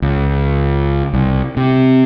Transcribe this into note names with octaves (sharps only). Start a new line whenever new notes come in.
C#2
C2
C3